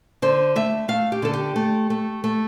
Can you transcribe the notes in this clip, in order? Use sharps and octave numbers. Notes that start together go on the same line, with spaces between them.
D3 C5
A3 E5
A3 F5
G4
D3 A4
G4
A3
A3
A3